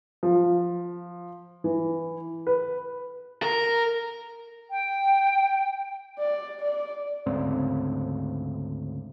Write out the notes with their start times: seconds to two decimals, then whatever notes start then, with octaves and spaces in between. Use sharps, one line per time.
0.23 F3
1.64 E3
2.47 B4
3.43 A#4
4.70 G5
6.19 D5
6.61 D5
7.26 D2 G#2 C#3 C4